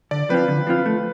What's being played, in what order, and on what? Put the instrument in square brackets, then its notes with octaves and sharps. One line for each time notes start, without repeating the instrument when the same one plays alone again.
[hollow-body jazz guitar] D3 [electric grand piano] D5
[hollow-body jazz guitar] F3 C4 F4 [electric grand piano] B4
[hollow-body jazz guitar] D3
F3 C4 F4
A3